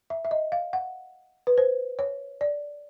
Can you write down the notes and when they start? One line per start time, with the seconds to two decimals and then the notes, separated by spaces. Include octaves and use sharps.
0.10 E5
0.25 E5
0.31 D#5
0.52 F5
0.73 F#5
1.47 B4
1.58 C5
1.99 C#5
2.41 D5